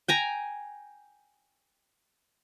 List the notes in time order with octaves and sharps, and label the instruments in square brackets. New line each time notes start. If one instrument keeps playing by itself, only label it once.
[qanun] G5 G#5 A#5